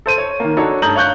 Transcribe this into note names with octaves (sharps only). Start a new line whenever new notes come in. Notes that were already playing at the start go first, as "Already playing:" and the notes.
A4 C5 D#7
C#5
D#3 A#3
D4 D#4 F#4 A4 C#5
G2 A3 A#5 D#6 G6 F#7
C#5 F5 C#6 F#6 G6